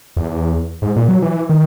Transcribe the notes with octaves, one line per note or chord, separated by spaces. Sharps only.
E2
G#2
A#2
F#3
E3
D#3